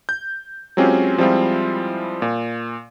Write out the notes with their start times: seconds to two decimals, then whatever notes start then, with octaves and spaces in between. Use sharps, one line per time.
0.09 G6
0.77 F#3 G#3 C4 C#4 F4 G4
1.18 F3 G3 G#3 C4 E4 F4
2.22 A#2